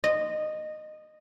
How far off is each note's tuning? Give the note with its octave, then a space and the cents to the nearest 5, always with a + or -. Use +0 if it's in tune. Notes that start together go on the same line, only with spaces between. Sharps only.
D#5 -15